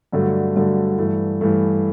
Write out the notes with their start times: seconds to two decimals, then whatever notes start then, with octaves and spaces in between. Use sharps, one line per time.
0.12 G2 D3 F#3 A3
0.56 G2 D3 F#3 A3
0.98 G2 E3 A3
1.41 G2 E3 A3